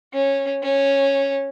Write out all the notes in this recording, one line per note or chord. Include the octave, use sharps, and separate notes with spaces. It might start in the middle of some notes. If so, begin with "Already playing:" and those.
C#4
C#4